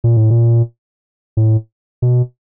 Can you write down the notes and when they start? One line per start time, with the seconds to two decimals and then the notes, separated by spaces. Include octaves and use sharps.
0.04 A#2
0.17 A2
0.30 A#2
1.37 A2
2.02 B2